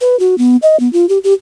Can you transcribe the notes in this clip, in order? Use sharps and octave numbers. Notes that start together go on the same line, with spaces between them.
B4
F#4
B3
D#5
B3
F4
G4
G4